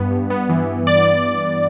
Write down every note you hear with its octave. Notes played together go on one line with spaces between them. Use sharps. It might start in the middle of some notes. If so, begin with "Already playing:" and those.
Already playing: G2 B3
G2
B3
E3
E3
D5